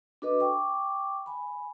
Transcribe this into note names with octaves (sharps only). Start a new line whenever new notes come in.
D4 F#4 A4 B4 D#5 D6
G5 C#6 D6
G#5 B5